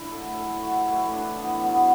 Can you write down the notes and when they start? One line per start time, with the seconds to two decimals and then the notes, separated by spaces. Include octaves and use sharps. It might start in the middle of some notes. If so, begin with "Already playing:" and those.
Already playing: D4 E4
0.11 A2 F#3 A4
0.36 A4
0.63 F#4
0.88 A2 E3 E4
1.13 D4
1.39 B3
1.63 B2 F#3 B3